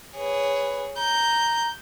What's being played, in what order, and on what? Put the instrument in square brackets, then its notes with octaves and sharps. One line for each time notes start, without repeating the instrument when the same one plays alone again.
[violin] G#4 C#5 [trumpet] B4
[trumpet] A#5 [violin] G6